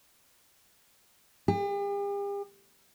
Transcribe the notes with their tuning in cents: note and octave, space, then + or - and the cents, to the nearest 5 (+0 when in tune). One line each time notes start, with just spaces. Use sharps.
G4 +45